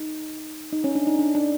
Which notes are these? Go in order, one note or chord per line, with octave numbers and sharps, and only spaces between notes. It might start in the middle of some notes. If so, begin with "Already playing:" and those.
Already playing: D#4
D#4
C#4
D4
D#4
D4
D4